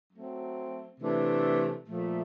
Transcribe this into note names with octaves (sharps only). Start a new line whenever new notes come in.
F#3 A3 C4
C3 E3 A3 D4
A#2 F3 A3